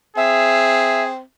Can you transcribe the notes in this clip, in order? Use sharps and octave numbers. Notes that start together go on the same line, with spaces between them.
C4 G#4 E5